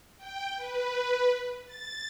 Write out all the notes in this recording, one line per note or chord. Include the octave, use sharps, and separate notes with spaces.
G5
B4
A6